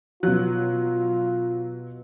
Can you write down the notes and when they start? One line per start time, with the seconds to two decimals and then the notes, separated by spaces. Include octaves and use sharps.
0.23 B2 F#3 F4 F#6